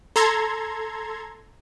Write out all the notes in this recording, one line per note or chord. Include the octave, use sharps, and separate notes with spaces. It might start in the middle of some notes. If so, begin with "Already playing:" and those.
A4 A#5 C6 G#6